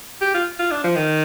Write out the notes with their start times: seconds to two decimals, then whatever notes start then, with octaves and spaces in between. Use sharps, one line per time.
0.21 G4
0.34 F4
0.59 F4
0.71 D4
0.84 F3
0.96 D#3